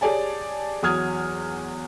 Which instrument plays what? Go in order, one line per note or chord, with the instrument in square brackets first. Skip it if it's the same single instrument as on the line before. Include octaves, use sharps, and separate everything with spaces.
[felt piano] G4 G#4 C#5 D5 G#5 A5
E2 F#3 D#6 F6 G#6